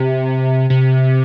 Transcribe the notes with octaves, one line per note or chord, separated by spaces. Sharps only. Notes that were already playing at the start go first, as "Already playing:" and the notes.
Already playing: C3
C3